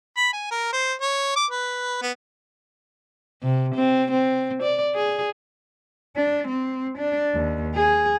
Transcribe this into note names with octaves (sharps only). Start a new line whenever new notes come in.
B5
G#5
A#4
C5
C#5
D6
B4
B3
C3
C4
C4
D5
G#4
D4
C4
D4
D#2
G#4